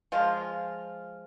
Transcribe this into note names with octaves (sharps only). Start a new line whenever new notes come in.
F3 G#3 F4